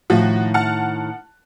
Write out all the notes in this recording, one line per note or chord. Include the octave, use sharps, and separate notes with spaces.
A2 D#3 F3 F#4
F#5 A5 F6